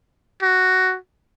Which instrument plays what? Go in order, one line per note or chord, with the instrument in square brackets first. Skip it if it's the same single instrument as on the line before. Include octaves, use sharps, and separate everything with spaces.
[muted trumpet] F#4